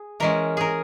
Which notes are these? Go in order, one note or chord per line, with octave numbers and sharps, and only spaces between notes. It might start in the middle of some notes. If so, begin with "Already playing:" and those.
Already playing: G#4
E3 G#3 C#4 A#4
G#4 A#4